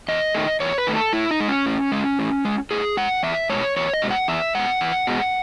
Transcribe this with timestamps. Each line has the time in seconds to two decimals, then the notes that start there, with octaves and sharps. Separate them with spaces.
0.08 E2 D#5
0.35 D#3 A3
0.60 E2 C#5
0.78 B4
0.87 D#3 A3
0.96 A4
1.13 A2 E4
1.31 D#4
1.40 G#3
1.48 C#4
1.66 A2
1.92 G#3
2.19 A2
2.45 G#3
2.71 A2 G#4
2.97 G#3 F#5
3.23 E2 E5
3.49 B2 G#3 C#5
3.76 E2 C#5
3.94 D#5
4.02 B2 G#3
4.10 F#5
4.28 E2 E5
4.55 B2 G#3 F#5
4.81 E2
5.07 B2 G#3